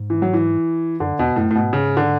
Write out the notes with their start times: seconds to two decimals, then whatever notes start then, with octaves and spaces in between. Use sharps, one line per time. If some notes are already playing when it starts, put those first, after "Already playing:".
Already playing: G#2
0.10 E3
0.22 F#3
0.33 E3
1.00 F#2 D3
1.19 E2 B2
1.36 F#2 A2
1.51 A2
1.55 G#2 B2
1.73 C#3
1.97 D3